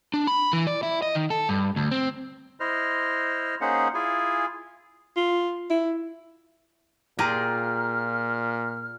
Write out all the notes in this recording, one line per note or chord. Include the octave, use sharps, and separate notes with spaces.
D4
B5
E3
D5
E4
D#5
D#3
A4
G2
D2
C4
E4 C5 D#5 F6
A#3 C#4 D#4 G#4 C5 F#5
E4 F4 G#4 G#5
F4
E4
A#2 F4 G4 G#4 A#5 F6 A#6